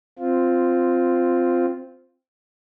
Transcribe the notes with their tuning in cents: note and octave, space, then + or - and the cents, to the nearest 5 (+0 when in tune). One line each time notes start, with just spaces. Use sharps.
C4 -5 F4 +0